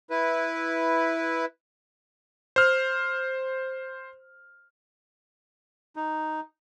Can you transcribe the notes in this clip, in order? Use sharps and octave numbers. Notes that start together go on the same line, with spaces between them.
E4 B4
C5 F6
D#4